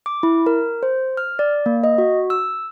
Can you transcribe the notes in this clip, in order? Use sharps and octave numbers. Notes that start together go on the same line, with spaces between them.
D6
E4
A#4
C5
F6
D5
A#3
D#5
F#4
E6